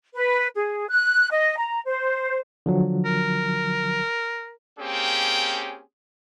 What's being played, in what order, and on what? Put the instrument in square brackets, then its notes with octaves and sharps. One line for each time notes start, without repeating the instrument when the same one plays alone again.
[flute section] B4
G#4
F#6
D#5
A#5
C5
[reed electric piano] D3 F3 F#3
[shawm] A#4
[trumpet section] A#3 C4 C#4 G4 G#4 G5